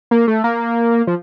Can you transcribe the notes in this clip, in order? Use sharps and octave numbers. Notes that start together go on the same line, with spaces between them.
A#3
A3
A#3
F3